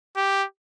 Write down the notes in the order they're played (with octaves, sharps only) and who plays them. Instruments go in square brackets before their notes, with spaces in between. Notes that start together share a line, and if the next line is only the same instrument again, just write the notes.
[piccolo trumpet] G4